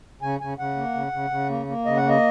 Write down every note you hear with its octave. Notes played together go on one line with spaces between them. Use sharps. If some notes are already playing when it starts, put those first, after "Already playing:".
C#3 G#5
C#3 G#5
C#3 F#5
A#3
C#3
C#3
C#3
A#3
A#3
C#3 D#5
F#5
A#3
D#5